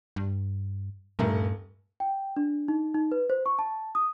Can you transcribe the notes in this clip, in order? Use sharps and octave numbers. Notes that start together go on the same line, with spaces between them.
G2
D#1 G2 A3 A#4
G5
D4
D#4
D#4
B4
C5
C#6
A5
D#6